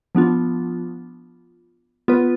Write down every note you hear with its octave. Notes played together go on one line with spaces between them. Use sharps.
F3 B3 D4 F4
B3 F4 B4